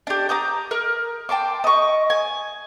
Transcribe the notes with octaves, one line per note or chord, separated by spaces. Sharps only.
D4 G4
A#5 D6 D#6 G6
A#4
G5 A5 C6 D6
D#5 C#6
G#5